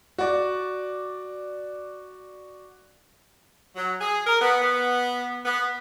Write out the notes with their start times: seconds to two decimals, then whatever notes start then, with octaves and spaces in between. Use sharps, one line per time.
0.18 F#4 D5
3.76 F#3
4.00 G#4
4.26 A#4
4.41 B3
4.62 B3
5.45 B3